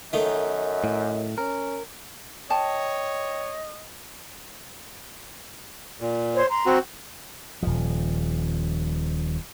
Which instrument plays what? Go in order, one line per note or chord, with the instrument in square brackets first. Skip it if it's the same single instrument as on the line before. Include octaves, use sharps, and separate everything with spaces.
[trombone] F#2 [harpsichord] D#3 A3 D#4 [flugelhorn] D#5
[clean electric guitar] A2
[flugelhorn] C#4 [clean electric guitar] A#4
[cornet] C#5 [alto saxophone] D#5 [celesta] G5 [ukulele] A5
[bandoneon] A#2
[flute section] C5 C#5 C6
A#5 C6
[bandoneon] C4 F#4
[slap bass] D#1 F3